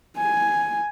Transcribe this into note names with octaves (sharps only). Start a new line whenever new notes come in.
G#5